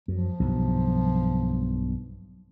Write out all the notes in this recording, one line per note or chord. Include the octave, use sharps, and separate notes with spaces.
F#2 F3
B1 G2